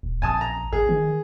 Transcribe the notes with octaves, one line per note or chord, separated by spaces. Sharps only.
D#1
A#1 G#5 A5 D#6
A#5
G#1 G#4
D#3